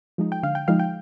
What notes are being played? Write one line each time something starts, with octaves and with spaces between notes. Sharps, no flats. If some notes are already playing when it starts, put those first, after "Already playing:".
F3 G#3 D#4
G5
D3 F5
G5
F3 G#3 D#4 F5
G5